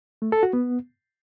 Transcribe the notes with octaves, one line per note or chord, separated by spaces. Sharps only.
A3
A4
F#4
B3